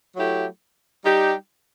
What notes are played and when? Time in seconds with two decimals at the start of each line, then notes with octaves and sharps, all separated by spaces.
0.16 F#3 A3 E4 G4
1.03 G3 D#4 G4